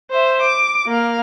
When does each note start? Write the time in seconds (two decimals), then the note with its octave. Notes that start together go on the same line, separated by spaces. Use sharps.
0.11 C5 E5
0.41 D6
0.87 A#3 F5